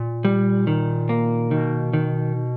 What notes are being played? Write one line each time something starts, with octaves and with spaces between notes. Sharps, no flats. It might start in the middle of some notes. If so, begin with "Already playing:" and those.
Already playing: A#2
G3
D#3
A#3
B2 D#3
D#3